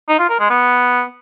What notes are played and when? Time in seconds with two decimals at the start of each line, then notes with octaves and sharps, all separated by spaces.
0.09 D#4
0.19 F4
0.29 A#4
0.40 G#3
0.50 B3